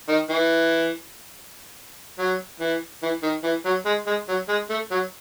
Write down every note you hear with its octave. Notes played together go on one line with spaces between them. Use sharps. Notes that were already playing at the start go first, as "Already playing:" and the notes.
D#3
E3
F#3
E3
E3
D#3
E3
F#3
G#3
G#3
F#3
G#3
A3
F#3